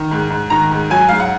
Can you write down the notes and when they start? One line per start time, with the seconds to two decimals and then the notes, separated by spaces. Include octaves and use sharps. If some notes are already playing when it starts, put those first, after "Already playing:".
Already playing: D#3
0.11 G#2
0.31 G#2
0.50 D#3 A#5
0.71 G#2
0.90 F#3 G#5
1.08 G#2 F5
1.20 F#5